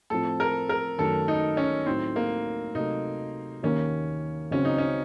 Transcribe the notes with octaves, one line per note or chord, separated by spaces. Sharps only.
A2 F3 C4 A4
A#4
A#4
F#2 D#3 A3 A4
D#4
C#4
A2 F#3 A3 C4 D#4
A#3
C3 F#3 A3 D#4
D#2 D#3 A#3 C#4
C#3 F#3 C4 C#4
D#4
C#4